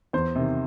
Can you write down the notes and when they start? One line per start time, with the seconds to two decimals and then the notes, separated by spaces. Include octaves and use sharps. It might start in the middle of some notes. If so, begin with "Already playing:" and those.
0.13 E2 C5
0.35 C3 D#3